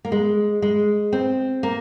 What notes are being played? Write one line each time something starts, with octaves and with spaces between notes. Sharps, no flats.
A#3
G#3
G#3
C4
A#3